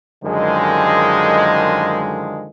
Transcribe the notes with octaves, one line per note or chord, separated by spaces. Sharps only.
F#2 D3 D#3 F3 G#3